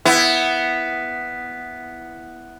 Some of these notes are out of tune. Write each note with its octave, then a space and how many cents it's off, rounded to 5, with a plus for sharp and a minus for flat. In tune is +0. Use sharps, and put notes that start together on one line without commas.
B3 +0 E4 +0